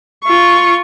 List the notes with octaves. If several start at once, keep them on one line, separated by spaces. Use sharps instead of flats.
F4 C#6